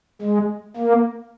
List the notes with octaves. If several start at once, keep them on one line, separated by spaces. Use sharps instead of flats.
G#3
A#3